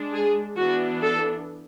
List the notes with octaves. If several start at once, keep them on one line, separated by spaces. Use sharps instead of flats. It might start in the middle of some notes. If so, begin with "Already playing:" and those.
Already playing: G#3 D4
G#4
E3 B3 D4 F#4
A4